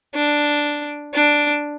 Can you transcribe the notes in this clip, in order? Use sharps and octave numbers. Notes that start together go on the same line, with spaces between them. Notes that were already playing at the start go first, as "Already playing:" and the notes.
D4
D4